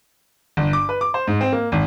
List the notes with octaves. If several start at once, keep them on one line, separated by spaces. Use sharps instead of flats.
G1
D6
B4
D6
C5
G#2
C4
A#3
G#1